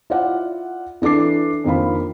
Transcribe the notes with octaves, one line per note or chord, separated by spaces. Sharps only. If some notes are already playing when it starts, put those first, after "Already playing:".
E4 F4 D5 F#5
E3 D4 A4 D6 C7
F2 D#3 A#3 D4 F4 B5